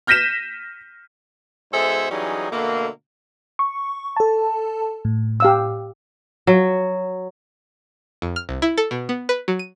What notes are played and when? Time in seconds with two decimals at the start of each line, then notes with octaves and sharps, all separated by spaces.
0.07 F6 G6 A#6 B6 D#7 E7
1.73 G#2 B2 G#4 A4 C5 E5
2.11 E3 F#3 G3 C#4 D#4 G#4
2.51 B2 D3 A3 A#3
3.59 C#6
4.16 A4 A5
5.05 A2
5.40 G4 F5 E6
6.47 F#3
8.22 F2
8.36 F6
8.49 C2
8.62 E4
8.78 A4
8.91 B2
9.09 B3
9.29 B4
9.48 F#3
9.59 D#7